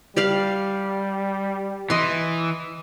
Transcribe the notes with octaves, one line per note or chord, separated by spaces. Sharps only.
G3 G4 D5 F5
E3 D#5 C6